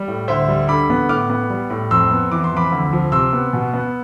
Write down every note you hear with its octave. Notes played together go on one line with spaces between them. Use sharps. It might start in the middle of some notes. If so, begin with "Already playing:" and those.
Already playing: G3
A2
D2 C5 E5
G3
D3 B5 D6
B3
A2 D6 F6
B3
G3
A2
F2 C6 E6
B3
E3 D6
C6
F2 B5 D6
D2
F3
C3 C6 E6
B3
B2
B3